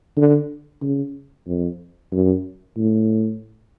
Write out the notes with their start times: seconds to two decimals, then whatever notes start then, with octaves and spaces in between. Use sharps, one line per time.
0.17 D3
0.82 C#3
1.47 F2
2.12 F#2
2.77 A2